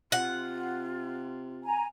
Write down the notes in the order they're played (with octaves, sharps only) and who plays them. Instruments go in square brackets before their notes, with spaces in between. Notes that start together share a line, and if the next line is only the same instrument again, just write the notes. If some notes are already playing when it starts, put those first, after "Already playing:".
[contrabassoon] C3 [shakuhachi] F4 [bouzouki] F#5
[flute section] G#5 A#5